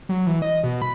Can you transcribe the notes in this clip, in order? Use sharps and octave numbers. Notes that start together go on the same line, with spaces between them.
F#3
E3
D#5
B2
B5